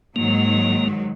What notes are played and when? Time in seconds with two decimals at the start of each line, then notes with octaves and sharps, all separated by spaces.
0.16 G#2 D#3 F#3 A#3